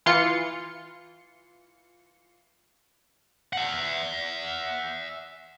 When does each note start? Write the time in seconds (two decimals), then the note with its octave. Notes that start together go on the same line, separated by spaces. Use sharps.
0.06 E3 F4 C6 C#7
3.53 E5 F#5